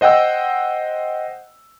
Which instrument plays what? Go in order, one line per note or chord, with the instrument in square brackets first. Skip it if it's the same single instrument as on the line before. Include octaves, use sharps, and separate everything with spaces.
[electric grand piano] C5 D#5 F#5 G5 E6